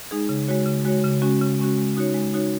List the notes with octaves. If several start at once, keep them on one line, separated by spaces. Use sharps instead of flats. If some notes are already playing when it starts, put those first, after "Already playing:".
G#3 D#4 G#4
C#3
G#3 F#4 C#5
C#3
G#3 F#4 C#5
C#3
G#3 C#4 F#4
C#3
G#3 C#4 F#4
G#3
D#4 F#4 C#5
G#3
D#4 F#4 C#5